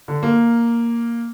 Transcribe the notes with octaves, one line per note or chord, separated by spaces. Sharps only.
D3
A#3